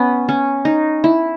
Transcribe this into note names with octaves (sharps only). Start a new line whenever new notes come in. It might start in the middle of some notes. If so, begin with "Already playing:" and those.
Already playing: B3 C#4
C#4
D#4
E4